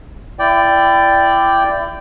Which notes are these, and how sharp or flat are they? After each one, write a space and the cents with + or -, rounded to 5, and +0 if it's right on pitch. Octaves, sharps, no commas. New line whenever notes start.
E4 +30 D5 +0 G5 +0